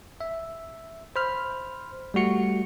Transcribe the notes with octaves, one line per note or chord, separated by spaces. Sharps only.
E5
C5 B5 F6
G3 A3 F#4 C#7